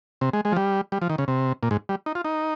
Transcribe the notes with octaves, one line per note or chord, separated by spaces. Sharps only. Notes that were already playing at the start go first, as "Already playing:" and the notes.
C3
G#3
G#3
F3
G3
G3
F3
D#3
C#3
C3
A#2
G#2
G3
D#4
F4
D#4